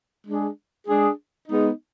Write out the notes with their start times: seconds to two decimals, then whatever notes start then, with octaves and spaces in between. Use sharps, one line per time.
0.26 G#3 D4 G#4
0.88 G#3 D4 G#4
1.49 G#3 B3 D#4